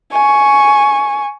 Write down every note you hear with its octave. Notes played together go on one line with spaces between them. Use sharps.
G#5 C#6